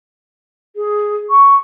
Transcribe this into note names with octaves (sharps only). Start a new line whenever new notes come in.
G#4
C#6